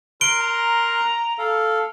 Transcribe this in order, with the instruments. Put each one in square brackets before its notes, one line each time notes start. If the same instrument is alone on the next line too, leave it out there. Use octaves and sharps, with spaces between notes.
[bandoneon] A#4 C6 F#6 [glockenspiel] D7 G7
[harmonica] A#5
[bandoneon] A4 F5